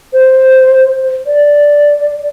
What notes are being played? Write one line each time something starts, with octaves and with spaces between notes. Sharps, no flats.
C5
D5